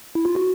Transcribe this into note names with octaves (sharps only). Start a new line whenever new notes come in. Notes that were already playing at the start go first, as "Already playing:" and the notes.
E4
F4
F#4